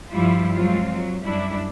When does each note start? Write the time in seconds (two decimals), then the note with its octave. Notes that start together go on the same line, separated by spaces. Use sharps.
0.11 G2 F3 G3 E4 F4
0.56 F#3 G#3 C4 F4
0.94 F#3
1.25 F#2 G3 D4 E4